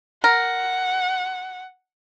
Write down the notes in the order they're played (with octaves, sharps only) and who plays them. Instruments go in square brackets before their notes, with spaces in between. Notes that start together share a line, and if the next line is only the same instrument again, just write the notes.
[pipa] A#4 [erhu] F#5